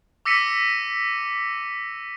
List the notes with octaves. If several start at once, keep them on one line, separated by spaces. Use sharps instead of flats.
D6 E6 A#6 B6 C#7 D#7